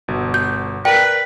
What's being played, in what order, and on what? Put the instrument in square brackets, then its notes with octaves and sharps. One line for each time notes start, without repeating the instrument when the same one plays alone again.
[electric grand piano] G1 B2
[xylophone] G6
[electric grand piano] A#4 D5 [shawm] B4 [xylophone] G5